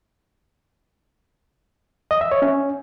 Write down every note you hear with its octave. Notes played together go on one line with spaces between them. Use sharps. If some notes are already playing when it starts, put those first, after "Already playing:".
D#5
E5
C#5
C#4